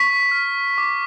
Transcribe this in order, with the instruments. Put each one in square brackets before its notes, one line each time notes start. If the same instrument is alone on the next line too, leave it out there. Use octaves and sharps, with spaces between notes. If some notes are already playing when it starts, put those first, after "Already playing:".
Already playing: [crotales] C#6 B6
F6
D6